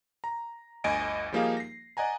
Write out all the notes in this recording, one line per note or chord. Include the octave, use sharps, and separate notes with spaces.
A#5
G1 D2 D#5 G#5 D7
F3 G3 A#3 D#4 G#4 F5
A#6 C7
D5 D#5 F#5 G#5 A#5